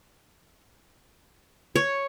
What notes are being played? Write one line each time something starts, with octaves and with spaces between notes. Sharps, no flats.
C#5